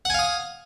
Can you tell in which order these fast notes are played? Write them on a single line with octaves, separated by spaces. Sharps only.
F#5 G#5 F5 D#6